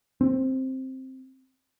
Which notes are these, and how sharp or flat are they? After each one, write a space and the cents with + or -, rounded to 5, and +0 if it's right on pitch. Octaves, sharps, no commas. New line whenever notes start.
C4 +5